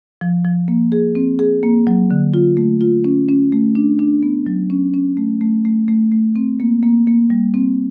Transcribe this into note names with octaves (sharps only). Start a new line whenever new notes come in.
F3
F3
A#3
G#4
C4
G#4
A#3
F#3
D3
F4
A3
F4
C#4
C#4
A3
D4
D4
B3
F#3
C#4
C#4
A3
A3
A3
A3
A3
C4
A#3
A#3
A#3
G3
C4